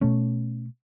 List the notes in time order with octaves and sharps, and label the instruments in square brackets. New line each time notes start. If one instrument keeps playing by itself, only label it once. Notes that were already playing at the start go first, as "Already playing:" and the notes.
[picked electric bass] B2 A3 C#4